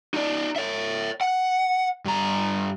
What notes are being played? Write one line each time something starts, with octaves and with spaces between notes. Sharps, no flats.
D#4 D5
C#5 E5
F#5
G2 A#5